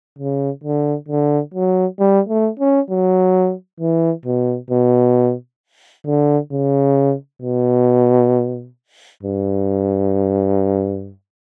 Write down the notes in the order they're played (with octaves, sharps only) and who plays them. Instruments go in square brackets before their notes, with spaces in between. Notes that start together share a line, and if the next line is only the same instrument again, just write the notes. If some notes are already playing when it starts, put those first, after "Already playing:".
[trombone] C#3
D3
D3
F#3
G3
A3
C#4
F#3
E3
B2
B2
D3
C#3
B2
G2